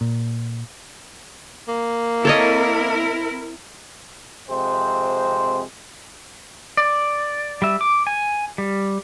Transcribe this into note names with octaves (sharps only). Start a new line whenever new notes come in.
A#2
A#3
C4 E4 A4 A#4 C#5 D#5
F2 C3 G#3 C4 C5
D5
G3 E5
D6
G#5
G3